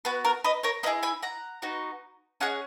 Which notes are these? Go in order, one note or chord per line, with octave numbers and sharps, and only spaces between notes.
B3 F#4 B4
A#4
B4 D#5
A#4 C#5
A#3 E4 G#4 B4 D#5
G#5 B5
F#5 A#5
B3 D#4 F#4
C#4 G#4 D#5 F#5